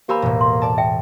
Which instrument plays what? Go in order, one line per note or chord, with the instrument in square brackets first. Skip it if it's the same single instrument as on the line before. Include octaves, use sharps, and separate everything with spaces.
[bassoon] A#3 [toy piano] G4 B5 [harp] C5 G#5 E6
[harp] E1 A2
[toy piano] C6
[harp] D5 A5
[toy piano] E5 G5